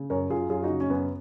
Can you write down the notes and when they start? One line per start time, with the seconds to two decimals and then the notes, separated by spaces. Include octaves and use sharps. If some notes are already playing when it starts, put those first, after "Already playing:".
Already playing: C#3
0.10 F#2 A#4 C#5
0.29 F#2 F4 G#4
0.49 F#2 F4 G#4
0.63 D#4 F#4
0.70 C#3
0.80 C#4
0.90 F#2 B3